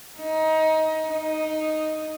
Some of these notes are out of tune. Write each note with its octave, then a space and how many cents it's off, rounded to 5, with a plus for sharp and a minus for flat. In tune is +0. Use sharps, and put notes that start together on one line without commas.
D#4 +20
D#4 +0